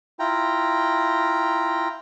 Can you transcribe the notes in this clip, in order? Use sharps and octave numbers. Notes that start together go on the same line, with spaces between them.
E4 F4 G5 A#5